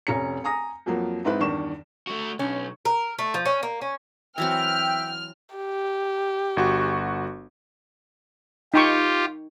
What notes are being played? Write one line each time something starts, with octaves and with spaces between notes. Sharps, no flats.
F1 C#4 A#5 C#7
G#5 A#5 D#6 A#6
F2 F3 F#3 A#3
G#2 C4 D#4 E4 B4 B5
E2 G2 D#3 C#6 E7
A3 F#4
B1 C#4
A#4
A3
F3
C#4
A#3
C#4
E3 F#3 C4 E5 G5 F6
G4
G1 F#4 C#6
D#4 F4 G4 G5 C#6